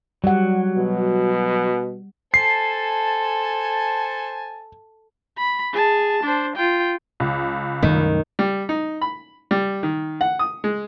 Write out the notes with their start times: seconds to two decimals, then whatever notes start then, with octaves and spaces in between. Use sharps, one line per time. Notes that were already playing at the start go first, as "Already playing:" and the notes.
0.24 F#3 G3 F#5
0.77 B2
2.34 A4 C5 G#5 A5 C7
5.38 B5
5.73 G#4 A5
6.23 D4 C5
6.56 F4 G5
7.20 C#2
7.82 C2 F#2 D#3 A3
8.39 G3
8.69 D#4
9.01 B5
9.51 G3
9.83 D#3
10.21 F#5
10.39 D#6
10.64 G#3